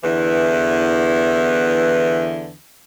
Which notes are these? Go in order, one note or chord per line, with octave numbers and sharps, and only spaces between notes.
E2 D3 E3 B3 E4